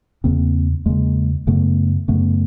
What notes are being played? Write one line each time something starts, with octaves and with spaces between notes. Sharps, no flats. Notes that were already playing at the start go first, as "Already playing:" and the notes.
E2 C#3 A#3 C4
E2 C#3 G#3 A#3
F#2 C#3 A3 B3
F#2 C#3 A3 B3